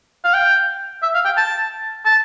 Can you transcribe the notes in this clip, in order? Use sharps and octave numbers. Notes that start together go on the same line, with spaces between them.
F5
G5
E5
F5
G5
A5
A5